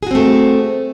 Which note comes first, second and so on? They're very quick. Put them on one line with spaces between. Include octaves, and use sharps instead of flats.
G#4 F#4 C4 A3